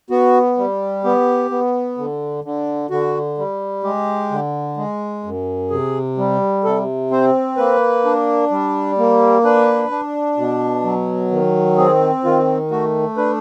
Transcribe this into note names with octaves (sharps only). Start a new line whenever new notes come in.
B3 F#4
G3
B3 G4
B3
D3
D3
D3 F#4
G3
G#3 G4
D3
G#3
F#2
C3 G#4
G3
C3 A4
C4 C5
A#3 B4
D4
G3
A#3
D4 B4
D4
B2
F#3
D#3
C4 G#4
D#3 F4
A3 F#4
D4 B4